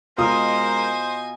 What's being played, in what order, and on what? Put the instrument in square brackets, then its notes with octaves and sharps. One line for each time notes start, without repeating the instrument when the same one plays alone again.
[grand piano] B2 F4 D#6 [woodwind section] G#3 A#4 [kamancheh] C5 [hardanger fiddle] D#5 G#5